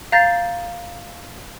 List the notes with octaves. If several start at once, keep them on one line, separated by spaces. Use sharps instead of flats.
F5 A#5 G6 A6 A#6 C7